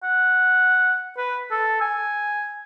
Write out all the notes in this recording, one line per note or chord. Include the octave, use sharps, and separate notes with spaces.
F#5
B4
A4
G#5